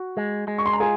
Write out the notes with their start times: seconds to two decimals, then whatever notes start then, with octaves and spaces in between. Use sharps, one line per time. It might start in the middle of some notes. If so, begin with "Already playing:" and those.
Already playing: F#4
0.17 G#3
0.48 G#3
0.58 C#6
0.66 C6
0.73 A#5
0.80 F4 G#4 G#5